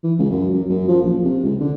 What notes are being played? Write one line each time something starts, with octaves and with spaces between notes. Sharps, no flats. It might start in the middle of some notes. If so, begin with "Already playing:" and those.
E3
C#2
F#2
F#2
F#2
F3
A#1
C3
C#2
D3